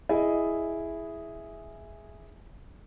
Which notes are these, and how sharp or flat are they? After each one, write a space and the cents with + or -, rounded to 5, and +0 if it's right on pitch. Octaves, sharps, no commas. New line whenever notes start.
E4 +0 G#4 +0 D#5 +0